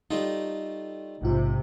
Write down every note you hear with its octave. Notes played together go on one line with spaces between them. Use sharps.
G3 A3 D#4 F4
A#1 G#2 C3 F4